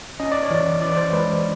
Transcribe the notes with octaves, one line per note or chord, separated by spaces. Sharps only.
C#4 D#5
D5
C#5
E3 D5
E3 D5
C5
G#3 B4